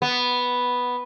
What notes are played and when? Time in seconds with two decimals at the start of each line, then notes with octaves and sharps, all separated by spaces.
0.02 B3